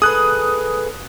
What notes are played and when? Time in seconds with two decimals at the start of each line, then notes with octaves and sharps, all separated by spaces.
0.02 G#4 A4 B4 D#6 F#6